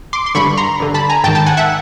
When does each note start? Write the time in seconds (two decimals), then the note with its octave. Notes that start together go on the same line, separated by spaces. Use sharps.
0.13 C6 D6
0.26 C6
0.35 G2 D3 B5 C#6
0.57 A#5 C6
0.80 G2 D3
0.94 A5 B5
1.10 G#5 A#5
1.24 G#2 G5 A5
1.27 D#3
1.35 G5 A5
1.46 F#5 G#5
1.57 E5 F#5